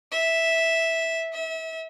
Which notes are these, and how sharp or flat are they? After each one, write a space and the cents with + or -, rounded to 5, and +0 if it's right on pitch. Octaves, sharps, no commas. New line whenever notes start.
E5 -5
E5 -30